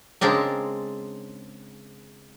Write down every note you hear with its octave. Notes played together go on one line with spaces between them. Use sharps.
C#3 G#3 C4 D4 A#4